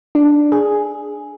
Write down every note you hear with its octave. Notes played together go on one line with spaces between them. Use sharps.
D4
G#4